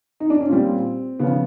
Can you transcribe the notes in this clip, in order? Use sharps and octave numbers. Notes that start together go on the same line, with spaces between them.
D#4
D4
C#4
A#2 G3 C4
C#3 F3 B3